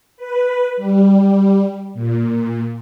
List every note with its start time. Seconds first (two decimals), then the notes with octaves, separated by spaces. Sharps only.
0.17 B4
0.77 G3
1.94 A#2